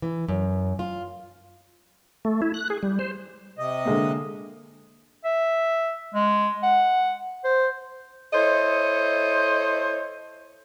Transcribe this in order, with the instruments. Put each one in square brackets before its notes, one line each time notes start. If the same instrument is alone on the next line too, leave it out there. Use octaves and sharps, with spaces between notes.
[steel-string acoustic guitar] E3
F#2
F4
[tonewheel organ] A3
E4
F#6
G#4
G3
C5
[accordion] C3 D#5
[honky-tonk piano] D3 G#3 A#3
[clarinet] E5
G#3
F#5
C5
[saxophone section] E4 A4 C5 C#5 D#5